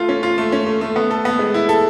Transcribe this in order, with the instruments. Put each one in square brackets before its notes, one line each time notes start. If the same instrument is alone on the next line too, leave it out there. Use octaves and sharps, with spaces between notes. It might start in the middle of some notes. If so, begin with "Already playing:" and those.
Already playing: [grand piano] A3 F4
C#4
F4
A3
C#4
A3
A3
B3
A4
B3
G#3
E4
A4